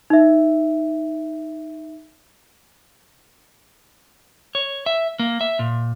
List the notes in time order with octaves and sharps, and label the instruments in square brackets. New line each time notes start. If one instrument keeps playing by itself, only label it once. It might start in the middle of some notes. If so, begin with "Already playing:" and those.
[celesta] D#4 E5
[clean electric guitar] C#5
E5
A#3
E5
A#2